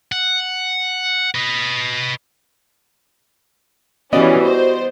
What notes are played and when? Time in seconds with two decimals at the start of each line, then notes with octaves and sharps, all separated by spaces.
0.12 F#5
1.35 B4 D#5
4.13 E3 G3 B3 C#4 F#4 D5 D#5
4.44 C5